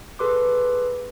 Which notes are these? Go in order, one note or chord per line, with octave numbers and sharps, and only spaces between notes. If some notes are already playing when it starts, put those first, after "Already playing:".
G#4 A4 B4 C6 D6